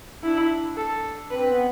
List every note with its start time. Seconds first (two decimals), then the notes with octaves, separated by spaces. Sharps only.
0.23 D4 E4
0.77 A4
1.30 C4 B4
1.48 B3